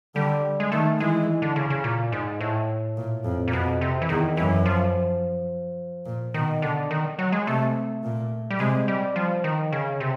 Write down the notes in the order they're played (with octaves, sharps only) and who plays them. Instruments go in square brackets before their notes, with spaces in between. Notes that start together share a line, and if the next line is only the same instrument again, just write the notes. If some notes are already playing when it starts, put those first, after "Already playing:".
[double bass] D3 [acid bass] G3
[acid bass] G#3
[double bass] D#3 [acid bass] A3
[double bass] E3 [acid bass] G#3
[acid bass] D3
C#3
C#3
A#2
G#2
A2
[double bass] A#2
F2
[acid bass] A#2
[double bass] F2 [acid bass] B2
[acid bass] C3
E3
[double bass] E2 [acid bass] D#3
[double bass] F#2 [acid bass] E3
[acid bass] F3
[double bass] A#2
[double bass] B2 [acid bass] D#3
[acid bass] D3
D#3
F#3
G#3
[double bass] C3 [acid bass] A3
[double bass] A#2
[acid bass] G3
[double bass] C3 [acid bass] G#3
[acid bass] G3
F3
D#3
C#3
C3